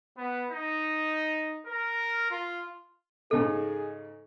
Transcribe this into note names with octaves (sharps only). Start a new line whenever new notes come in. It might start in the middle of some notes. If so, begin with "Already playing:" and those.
B3
D#4
A#4
F4
G#2 C#3 D#4 G#4 A4